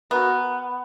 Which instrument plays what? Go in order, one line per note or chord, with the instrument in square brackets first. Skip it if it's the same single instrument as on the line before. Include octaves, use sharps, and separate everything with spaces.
[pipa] B3 [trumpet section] F#4 A#4